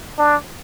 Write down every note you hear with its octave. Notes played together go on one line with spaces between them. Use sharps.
D4